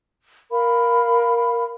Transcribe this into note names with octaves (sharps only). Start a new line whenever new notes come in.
A#4 F5 B5